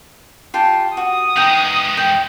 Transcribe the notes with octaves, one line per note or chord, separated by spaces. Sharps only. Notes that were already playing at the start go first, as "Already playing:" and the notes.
F4 G4 A5
F#4 D#6
E3 G#3 D#4 G5
G5